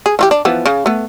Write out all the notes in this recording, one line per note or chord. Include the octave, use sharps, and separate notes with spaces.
G#4
E3 F4 G4
D4
E3 F3 B3
C#3
A3 B3